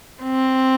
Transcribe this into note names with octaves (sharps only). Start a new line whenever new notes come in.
C4